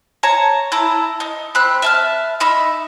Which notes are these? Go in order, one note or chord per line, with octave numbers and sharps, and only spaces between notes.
C#5 A5 A#5
E4 A5 A#5
D#4
C4 B5 F#6
E5 A5 F6
D#4 E5 B5